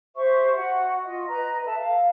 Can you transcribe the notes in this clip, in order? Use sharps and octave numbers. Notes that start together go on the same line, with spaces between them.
G4 C5 E5 C#6
F#4 F#5
F4 D#5
B4 D#5 A#5
A4 E5 A5
F5